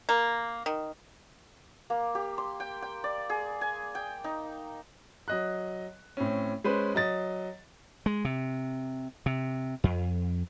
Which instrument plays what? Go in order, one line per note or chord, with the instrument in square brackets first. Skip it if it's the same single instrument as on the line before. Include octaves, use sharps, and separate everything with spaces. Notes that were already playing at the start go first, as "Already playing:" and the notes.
[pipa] A#3
D#3
[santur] A#3
G4
C6
G5
G5
D5
G#4
G#5
G5
D#4
[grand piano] F#3 D#5 F#6
A2 C4 C#4
G#3 C#4 B4 C5
F#3 D#5 A6
[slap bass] G#3
C3
C3
F2